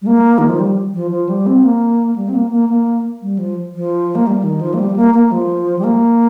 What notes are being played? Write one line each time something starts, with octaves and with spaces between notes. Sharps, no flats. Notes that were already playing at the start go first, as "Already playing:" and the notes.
G3
A#3
D#3
F3
G3
F3
F3
G3
C4
A#3
G3
C4
A#3
A#3
A#3
G3
F3
F3
A#3
G3
D#3
F3
A#3
G3
A#3
A#3
F3
G3
A#3